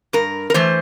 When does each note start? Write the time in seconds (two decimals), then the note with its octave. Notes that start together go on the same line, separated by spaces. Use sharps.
0.13 G2 A#4
0.50 A#4
0.54 E3 A3 C5